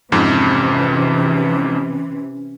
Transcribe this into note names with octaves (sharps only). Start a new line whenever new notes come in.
F2 G#2 C3 E3 C#4